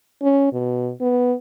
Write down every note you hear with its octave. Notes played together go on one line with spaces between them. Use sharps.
C#4
B2
B3